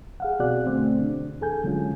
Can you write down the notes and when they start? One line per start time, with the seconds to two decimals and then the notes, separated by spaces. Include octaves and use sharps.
0.20 G#4 F5 F#5
0.39 B2 C4 F#4 G#4 D5 F#6
0.67 B2 D3 A3 C4
0.99 D4
1.40 D#2 G#4 A4 G#5 G6
1.64 D3 F#3 G#3 C#4 F4